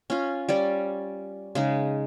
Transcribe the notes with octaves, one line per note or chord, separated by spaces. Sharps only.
C#4 F4
G3 C#4 D5
C#3 G#3 D#4